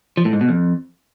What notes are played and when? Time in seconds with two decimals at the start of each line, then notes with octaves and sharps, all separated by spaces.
0.17 F3
0.25 A2
0.33 G#2
0.41 B2
0.49 F2